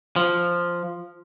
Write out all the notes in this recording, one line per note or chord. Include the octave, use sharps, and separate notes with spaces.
F3